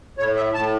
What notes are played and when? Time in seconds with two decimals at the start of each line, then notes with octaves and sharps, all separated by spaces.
0.18 A2 C#5
0.36 E5
0.54 A2 A5